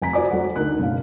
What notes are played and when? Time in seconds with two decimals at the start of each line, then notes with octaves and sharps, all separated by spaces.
0.02 F1 G#5 A#5 B6
0.13 F4 F#4 C5 D5 G#5 D6
0.31 F#3 A4 F#5
0.56 D2 D#4 A#4 F#6
0.79 F#1 B2 F5